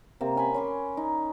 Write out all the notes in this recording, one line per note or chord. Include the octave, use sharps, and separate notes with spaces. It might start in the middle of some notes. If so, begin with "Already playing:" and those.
C3 A#3 C4
C#4 G#5 B5
C#4 C6 D6
D#4